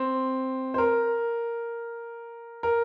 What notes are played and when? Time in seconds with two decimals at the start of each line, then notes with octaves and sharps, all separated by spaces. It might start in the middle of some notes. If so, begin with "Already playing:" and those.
Already playing: C4
0.74 C5
0.78 A#4
2.63 A#4